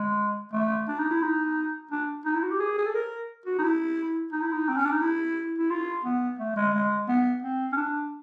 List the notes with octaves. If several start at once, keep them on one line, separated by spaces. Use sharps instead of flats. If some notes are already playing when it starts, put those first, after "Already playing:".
Already playing: G#3
A3
D4
D#4
E4
D#4
D4
D#4
E4
F#4
G4
G#4
G#4
A4
A#4
F#4
D#4
E4
D#4
E4
D#4
C4
C#4
D4
D#4
E4
E4
F4
B3
A3
G#3
G#3
B3
C4
C#4
D4